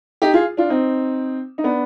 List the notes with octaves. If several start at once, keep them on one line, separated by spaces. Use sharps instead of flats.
D#4 G4
F4 G#4
D4 F4
C4 D#4
D#4
B3 D4